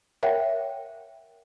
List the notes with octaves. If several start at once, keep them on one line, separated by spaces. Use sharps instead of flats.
A#4 C#5 E5 F#5 G5